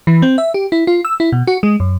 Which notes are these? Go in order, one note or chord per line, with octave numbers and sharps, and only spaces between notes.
E3
C4
E5
G4
E4
F4
E6
E4
B2
F#4
G#3
F#2